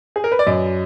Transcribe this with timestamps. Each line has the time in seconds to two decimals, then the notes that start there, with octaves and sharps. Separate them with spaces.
0.16 G#4
0.24 A#4
0.32 B4
0.39 D5
0.47 F#2 D#5